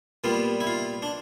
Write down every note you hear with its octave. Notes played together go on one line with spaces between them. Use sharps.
A#2 G3 B3 F4
E4
F4
D4